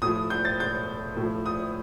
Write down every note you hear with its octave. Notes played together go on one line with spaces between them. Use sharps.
A2 F3 D#6
G6
A6
G6
A2 F3
D#6